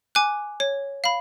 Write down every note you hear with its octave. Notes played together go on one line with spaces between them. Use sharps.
G#5 D6 F#6
C#5
F5 B5